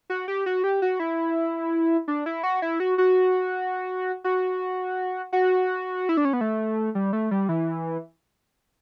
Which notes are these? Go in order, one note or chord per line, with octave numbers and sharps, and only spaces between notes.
F#4
G4
F#4
G4
F#4
E4
D4
E4
F#4
E4
F#4
F#4
F#4
F#4
E4
D4
C#4
B3
A3
G3
A3
G3
E3